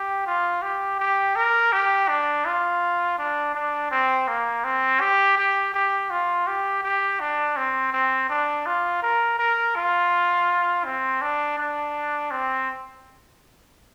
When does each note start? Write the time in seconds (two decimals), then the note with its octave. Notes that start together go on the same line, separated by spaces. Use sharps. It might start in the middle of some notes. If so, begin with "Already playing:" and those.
Already playing: G4
0.26 F4
0.62 G4
0.99 G4
1.36 A#4
1.72 G4
2.09 D4
2.46 F4
3.18 D4
3.55 D4
3.91 C4
4.28 A#3
4.64 C4
5.01 G4
5.38 G4
5.74 G4
6.10 F4
6.47 G4
6.83 G4
7.20 D4
7.57 C4
7.93 C4
8.29 D4
8.66 F4
9.02 A#4
9.39 A#4
9.76 F4
10.85 C4
11.22 D4
11.58 D4
12.31 C4